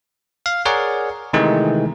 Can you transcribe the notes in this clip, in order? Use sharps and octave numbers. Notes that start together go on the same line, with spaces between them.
F5
G#4 A#4 C#5 D5 F#5
C3 D#3 E3 G#3 A3 D#4